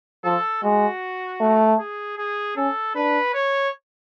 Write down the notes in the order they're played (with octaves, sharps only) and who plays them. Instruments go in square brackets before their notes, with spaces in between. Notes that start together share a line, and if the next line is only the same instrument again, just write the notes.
[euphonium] F3 [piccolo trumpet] A4
[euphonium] G#3 [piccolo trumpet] F#4
[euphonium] A3
[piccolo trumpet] G#4
G#4
[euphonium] C#4 [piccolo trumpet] A4
[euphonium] D4 [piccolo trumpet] B4
[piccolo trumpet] C#5